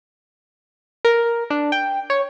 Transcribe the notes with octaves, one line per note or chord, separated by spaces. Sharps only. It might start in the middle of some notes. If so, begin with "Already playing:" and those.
A#4
D4
G5
C#5